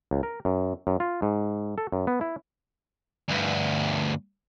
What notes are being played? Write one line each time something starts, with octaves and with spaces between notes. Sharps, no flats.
C#2
A#4
F#2
F#2
F4
G#2
A4
F#2
B3
E4
D2 G2